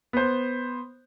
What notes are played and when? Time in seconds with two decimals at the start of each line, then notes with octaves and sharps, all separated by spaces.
0.13 B3 C5